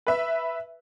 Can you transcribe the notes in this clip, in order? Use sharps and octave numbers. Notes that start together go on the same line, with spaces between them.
B4 E5